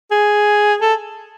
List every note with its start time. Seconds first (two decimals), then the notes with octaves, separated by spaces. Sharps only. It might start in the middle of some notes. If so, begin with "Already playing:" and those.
0.11 G#4
0.81 A4